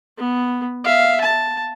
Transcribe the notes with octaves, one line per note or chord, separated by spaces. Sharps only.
B3
E5 F5
A5